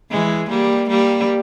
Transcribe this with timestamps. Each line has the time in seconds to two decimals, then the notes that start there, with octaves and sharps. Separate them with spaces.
0.10 E3 G#3
0.50 G3 A#3
0.89 G3 A#3